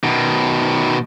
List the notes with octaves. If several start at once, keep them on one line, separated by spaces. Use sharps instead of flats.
B2 D#3